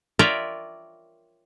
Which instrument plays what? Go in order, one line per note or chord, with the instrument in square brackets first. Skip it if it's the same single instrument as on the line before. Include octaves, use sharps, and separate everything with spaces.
[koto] F4 A#4 C#5 D5 E5 G5